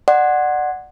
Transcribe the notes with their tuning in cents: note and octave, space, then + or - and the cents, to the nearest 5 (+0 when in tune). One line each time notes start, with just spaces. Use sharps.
D5 +25 F#5 +0 C6 +20